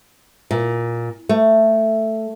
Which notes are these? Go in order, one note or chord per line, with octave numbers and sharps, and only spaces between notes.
A#2
A3